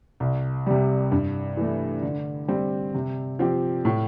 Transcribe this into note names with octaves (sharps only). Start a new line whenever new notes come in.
C2
C3 G3
G2
E3 A3
D3
G3 C4
C3
F3 C4 G4
A2